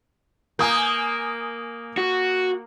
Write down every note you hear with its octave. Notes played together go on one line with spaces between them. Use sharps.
A#3 G#5 D#6 G6
F#4